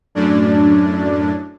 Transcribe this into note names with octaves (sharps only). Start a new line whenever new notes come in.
F#2 A2 D4